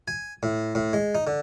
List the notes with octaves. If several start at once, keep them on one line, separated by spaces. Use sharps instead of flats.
G#5
A2
A2
G#3
D#4
D3